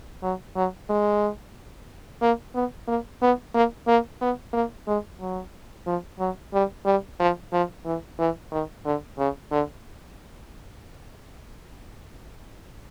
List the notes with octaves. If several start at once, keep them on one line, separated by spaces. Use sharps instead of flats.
F#3
F#3
G#3
A#3
B3
A#3
B3
A#3
A#3
B3
A#3
G#3
F#3
F3
F#3
G3
G3
F3
F3
E3
E3
D#3
D3
C#3
D3